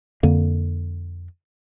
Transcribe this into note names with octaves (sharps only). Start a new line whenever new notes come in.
F2 D3 A#3